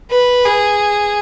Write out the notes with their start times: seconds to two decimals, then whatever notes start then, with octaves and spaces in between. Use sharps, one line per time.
0.11 B4
0.45 G#4